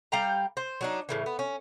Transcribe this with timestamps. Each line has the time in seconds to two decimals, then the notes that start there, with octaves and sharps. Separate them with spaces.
0.12 G3 F5 G5 A#5
0.57 C5
0.81 F#3 D4 D#4
1.09 A2 C#3 E3
1.26 B3
1.39 C#4